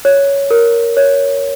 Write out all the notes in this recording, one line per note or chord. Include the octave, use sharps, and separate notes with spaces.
C#5
A#4
C#5